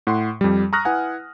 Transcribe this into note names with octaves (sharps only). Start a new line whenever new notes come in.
A2 F#5 C6
F2 G3
A#5 C#6 D#6 F6 F#6 A#6
E4 B4 F#5 G#5